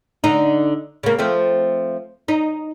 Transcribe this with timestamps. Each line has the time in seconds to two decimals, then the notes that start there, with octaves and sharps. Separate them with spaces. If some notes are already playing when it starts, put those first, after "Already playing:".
0.24 D3 D#4
1.03 C#3 A#3
1.18 F3 A3 C4
2.28 D#4